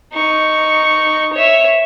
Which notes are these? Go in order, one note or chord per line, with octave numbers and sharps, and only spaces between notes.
D#4 C#6
C#5 E5